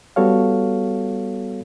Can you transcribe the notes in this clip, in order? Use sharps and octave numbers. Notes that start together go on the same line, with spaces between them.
G3 B3 F#4 A4 C#5 F5